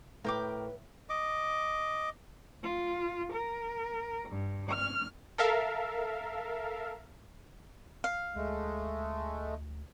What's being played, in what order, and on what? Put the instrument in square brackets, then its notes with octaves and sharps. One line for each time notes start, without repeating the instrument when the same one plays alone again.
[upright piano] A2 [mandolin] A#4 G5 D6 [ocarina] B4
[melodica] D#5 D6
[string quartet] F4
A#4
G2
F6
[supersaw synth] A4 A#4 E5 F5
[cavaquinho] F5
[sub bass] D2 [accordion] G#3 A3